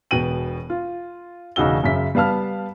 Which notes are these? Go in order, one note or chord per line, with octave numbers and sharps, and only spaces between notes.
E1 B2 B3 G5 D#7 F#7
F4
E1 C#3 D#4 F#4 E6 G7
F#2 C#3 E5 B6
G3 B3 F5 A5 F6